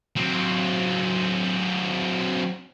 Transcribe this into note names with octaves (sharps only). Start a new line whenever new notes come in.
F#3 C4